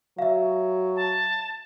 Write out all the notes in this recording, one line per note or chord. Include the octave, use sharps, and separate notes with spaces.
F#3 E5 F5
A5